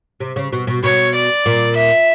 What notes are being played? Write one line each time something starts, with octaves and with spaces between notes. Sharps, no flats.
C3
C#3
B2
B2
B2 C#5
D5
A#2
E5